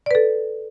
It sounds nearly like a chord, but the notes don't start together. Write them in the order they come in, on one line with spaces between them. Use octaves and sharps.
D5 B4 A4